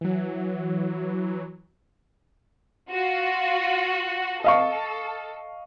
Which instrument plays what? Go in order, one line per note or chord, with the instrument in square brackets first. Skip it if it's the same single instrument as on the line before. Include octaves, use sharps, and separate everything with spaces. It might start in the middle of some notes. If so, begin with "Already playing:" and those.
[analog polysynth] E3 F#3
[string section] F4 F#4
[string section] A4 [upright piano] D#5 F5 C#6